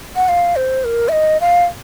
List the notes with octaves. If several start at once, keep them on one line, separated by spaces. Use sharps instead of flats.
F#5
F5
C5
A#4
E5
D#5
F5